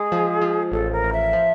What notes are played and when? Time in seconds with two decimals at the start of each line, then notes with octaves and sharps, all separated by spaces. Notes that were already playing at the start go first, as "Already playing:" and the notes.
Already playing: G#3 G#4
0.12 F3
0.41 F3
0.72 A1 A4
0.92 A#4
1.03 A1
1.12 E5
1.33 F3